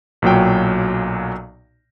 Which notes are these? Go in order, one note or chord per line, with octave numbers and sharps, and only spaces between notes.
B1 A#2 F#3 G5